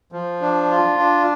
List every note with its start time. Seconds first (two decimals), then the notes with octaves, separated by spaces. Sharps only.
0.12 F3
0.41 D4
0.71 F4
0.99 D4